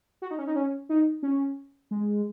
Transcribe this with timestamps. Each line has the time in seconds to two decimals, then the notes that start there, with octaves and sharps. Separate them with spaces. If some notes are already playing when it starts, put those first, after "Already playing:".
0.22 F#4
0.31 D#4
0.39 C#4
0.47 D#4
0.56 C#4
0.89 D#4
1.23 C#4
1.91 G#3